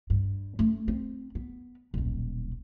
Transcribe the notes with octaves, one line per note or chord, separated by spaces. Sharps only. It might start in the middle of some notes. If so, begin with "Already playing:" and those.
G2
A3 C#4
C4
B3
D#1 B1